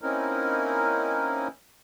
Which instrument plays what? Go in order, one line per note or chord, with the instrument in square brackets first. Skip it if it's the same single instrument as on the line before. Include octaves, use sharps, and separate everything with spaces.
[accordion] A#3 C4 C#4 D#4 E4 A#4